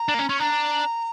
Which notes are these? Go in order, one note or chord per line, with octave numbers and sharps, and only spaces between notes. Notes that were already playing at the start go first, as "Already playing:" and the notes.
Already playing: A#5
D4
A#3
C#4
C#4 C#6
D4 A#5